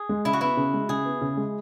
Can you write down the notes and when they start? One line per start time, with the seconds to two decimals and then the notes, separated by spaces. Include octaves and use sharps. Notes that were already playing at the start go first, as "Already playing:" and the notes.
Already playing: G#4
0.09 G#3
0.25 C#3 E4
0.33 F#4
0.41 B3 E4
0.57 C#3
0.74 G#3
0.89 C#3 G#4
1.05 B3
1.21 C#3
1.37 G#3